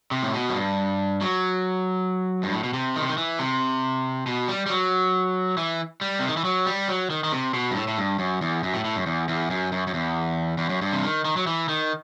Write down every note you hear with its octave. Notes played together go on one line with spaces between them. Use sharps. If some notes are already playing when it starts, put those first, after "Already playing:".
C3
A2
B2
F#2
G2
F#3
G2
A2
B2
C3
D#3
C3
D#3
E3
C3
B2
G3
G3
F#3
E3
G3
C3
D#3
E3
F#3
G3
F#3
D#3
D#3
C3
B2
G2
A2
A2
G2
F#2
E2
F#2
A2
A2
F#2
E2
E2
F#2
F#2
F#2
E2
E2
F#2
G2
C3
D#3
D#3
F#3
E3
D#3